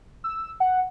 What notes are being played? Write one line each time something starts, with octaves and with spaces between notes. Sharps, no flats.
E6
F#5